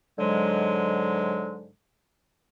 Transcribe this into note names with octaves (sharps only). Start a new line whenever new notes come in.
G#2 D3 F#3 G#3